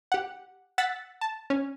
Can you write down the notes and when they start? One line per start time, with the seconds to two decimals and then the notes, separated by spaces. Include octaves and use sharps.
0.12 G4 F#5
0.78 F#5 E6 A6 B6
1.21 A5
1.50 C#4